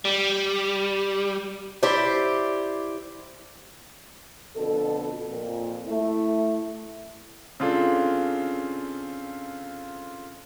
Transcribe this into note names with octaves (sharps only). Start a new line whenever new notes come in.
G3
E4 G4 C5 D5
F2 B2 D3 A4
F2 A#2
A3 E4
C#3 C4 D4 F4 A4